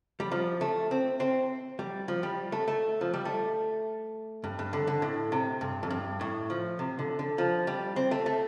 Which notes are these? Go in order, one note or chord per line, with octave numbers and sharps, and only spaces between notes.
G3
F3
A3
C4
C4
G3
F3
G3
A3
A3
F3
G3
A3
G2
G2
D3
D3
A2
C3
G2
F2
G2
A2
F3
C3
D3
D3
F3
G3
C4
A3
A3